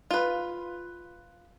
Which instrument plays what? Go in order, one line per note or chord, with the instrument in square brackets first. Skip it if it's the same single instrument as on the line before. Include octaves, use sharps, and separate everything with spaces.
[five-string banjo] F4 B4